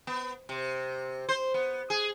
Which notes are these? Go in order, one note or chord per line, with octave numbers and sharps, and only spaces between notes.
B3
C3
C5
B3
G#4